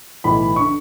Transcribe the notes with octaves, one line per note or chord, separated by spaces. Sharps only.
B1 A2 E3 B5
D3 C#6